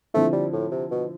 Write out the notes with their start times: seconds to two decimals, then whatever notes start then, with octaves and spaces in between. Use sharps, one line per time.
0.14 D3 F3 A3 C4 E4
0.33 G3
0.53 A2
0.72 C3
0.91 B2